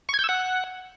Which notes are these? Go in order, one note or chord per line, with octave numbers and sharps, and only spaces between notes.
C#6
G#6
G6
E6
F#5